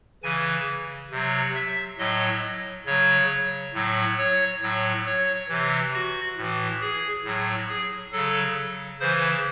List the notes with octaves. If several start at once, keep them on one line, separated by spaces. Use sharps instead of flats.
C#3 E3 G#5
C3 F#3
E5
A2 F#3 D#5
C#3 F#3 C#5
A2 F#3
C#5
A2 F#3
C#5
C3 E3
F#4
A2 E3
G#4
A2 F#3
G#4
C#3 F#3 A4
C#3 E3 C5